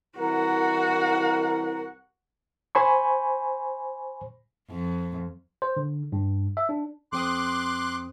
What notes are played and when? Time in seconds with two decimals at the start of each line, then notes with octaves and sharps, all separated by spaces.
0.18 C2 E3 F#4 A#4 F#5
2.75 C5 G#5 B5 C#6
4.70 F2
5.62 C5
5.77 D3
6.12 G2
6.57 E5
6.69 D4
7.12 F2 C4 C6 D6 D#6 F#6